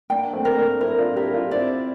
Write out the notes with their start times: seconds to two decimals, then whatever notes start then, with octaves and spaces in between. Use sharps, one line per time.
0.10 A#3 D4 G5
0.33 A3 C4
0.45 A#4
0.57 A#3 D4
0.80 C4 E4 A#4
0.99 D4 F4
1.16 E4 G4 A#4
1.33 D4 F4
1.51 C4 E4 D5